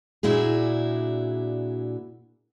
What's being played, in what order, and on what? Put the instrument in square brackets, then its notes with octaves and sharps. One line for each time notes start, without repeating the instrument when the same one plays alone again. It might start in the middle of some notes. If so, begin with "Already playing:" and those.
[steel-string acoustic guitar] A#2 D4 E4 F#4 G#4